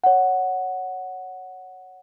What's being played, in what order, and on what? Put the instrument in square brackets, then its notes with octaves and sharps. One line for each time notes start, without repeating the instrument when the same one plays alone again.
[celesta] C#5 F#5